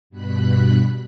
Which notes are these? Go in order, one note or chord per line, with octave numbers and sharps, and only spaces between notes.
G2 B2 B5 F#6